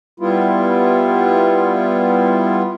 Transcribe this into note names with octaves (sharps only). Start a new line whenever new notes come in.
G3 B3 E4 F4